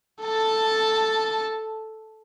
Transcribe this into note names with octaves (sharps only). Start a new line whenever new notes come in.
A4 A5